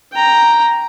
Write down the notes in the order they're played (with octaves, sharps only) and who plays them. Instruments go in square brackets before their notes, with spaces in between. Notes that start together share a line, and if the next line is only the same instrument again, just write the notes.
[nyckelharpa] G5 A#5